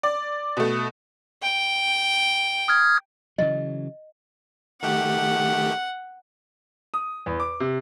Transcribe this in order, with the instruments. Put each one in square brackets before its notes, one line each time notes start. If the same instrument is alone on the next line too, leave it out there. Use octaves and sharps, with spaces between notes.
[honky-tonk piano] D5
B2 A3
[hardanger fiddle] G5
[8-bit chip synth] D#6 F6 G#6
[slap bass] C#3 E3 F#3 [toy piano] D#5
[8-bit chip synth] D#3 A3 G4 [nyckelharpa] F#5
[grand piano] D#6
E2
D6
C3